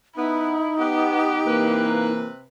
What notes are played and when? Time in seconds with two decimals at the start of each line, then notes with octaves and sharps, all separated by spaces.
0.16 B3 D#4 E4
0.79 B3 G4
1.46 C3 E3 A#3 B4